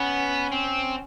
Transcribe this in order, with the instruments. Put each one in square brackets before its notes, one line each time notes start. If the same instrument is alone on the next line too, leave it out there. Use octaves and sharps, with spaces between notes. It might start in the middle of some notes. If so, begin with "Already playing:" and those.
Already playing: [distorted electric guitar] B3 [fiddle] C#4
[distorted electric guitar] C4